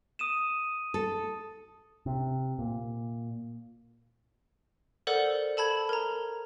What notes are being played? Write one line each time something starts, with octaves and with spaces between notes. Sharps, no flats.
D#6 D#7 E7
A4
C3
A#2
A4 A#4 C5 D5 F#5
A4 A5 B5 G#6
A#4 A#5